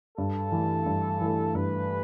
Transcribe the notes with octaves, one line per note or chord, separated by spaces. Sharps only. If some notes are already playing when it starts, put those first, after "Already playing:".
G2 A4
E3 A3
G2
E3 A3
G2 B4